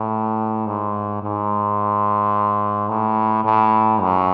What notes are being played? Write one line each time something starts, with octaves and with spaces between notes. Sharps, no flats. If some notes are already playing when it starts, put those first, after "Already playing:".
Already playing: A2
G#2
G#2
A2
A2
F#2